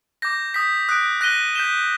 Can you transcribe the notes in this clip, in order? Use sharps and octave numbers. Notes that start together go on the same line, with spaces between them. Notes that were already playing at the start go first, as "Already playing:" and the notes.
D6 G6 A#6
D#6 G6 B6
D#6 F#6 B6 D7
F#6 A#6 D#7 G7
G6 B6 E7 G7